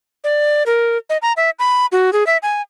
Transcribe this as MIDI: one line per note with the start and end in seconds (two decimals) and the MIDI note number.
0.24 0.63 74
0.66 0.98 70
1.10 1.17 75
1.22 1.33 82
1.37 1.50 76
1.59 1.86 83
1.92 2.13 66
2.13 2.26 68
2.27 2.37 76
2.43 2.62 80